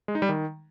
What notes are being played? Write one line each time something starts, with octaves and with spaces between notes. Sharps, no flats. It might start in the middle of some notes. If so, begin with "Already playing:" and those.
G#3
D#4
G3
D#3